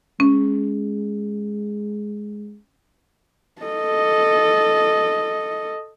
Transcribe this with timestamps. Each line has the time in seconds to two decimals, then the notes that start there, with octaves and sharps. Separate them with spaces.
0.20 G#3 C#4
3.62 A4 D#5